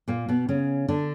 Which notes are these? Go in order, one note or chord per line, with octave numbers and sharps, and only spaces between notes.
A#2 A#3
B2 B3
C#3 C#4
D3 D4